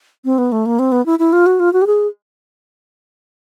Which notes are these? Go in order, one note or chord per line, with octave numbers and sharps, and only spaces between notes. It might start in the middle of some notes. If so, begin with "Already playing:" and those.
C4
B3
A3
A#3
C4
B3
E4
E4
F4
F#4
F4
F#4
G4
G#4